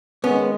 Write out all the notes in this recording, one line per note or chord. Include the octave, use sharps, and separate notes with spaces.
D#3 G#3 B3 C#4